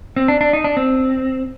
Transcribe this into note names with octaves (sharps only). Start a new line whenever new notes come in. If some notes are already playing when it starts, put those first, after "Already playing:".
C4
D4
D4
D#4
D4
C4